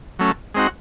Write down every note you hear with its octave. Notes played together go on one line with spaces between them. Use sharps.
F#3 A3 C#4
G#3 C4 D#4 F#4